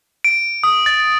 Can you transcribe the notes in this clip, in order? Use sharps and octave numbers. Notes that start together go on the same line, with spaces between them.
D7
D#6
A6